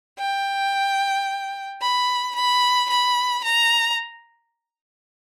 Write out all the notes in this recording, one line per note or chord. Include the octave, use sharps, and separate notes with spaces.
G5
B5
B5
B5
A#5